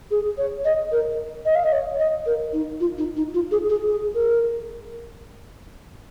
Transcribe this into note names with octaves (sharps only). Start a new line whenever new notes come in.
G#4
C#5
D#5
A#4
D#5
F5
D#5
C#5
D#5
A#4
D#4
F4
D#4
D#4
F4
G#4
G#4
G#4
A#4